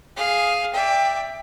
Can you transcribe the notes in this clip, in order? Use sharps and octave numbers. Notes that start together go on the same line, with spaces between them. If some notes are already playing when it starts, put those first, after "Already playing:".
G#4 F5
D5 E5 G5